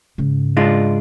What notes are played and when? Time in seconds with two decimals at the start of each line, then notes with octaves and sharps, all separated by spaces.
0.18 G#2 C#3
0.57 G#3 D4 F4